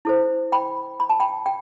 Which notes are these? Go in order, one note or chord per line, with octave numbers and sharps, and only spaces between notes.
E4 A4 C5
G5 B5
B5
A5
G5 B5
G5